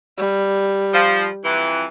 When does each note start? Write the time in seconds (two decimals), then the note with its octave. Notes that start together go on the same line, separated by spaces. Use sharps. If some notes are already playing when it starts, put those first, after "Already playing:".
0.18 G3
0.93 F3
1.45 F2 E3